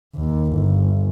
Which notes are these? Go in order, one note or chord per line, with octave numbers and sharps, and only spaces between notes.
D#2
G1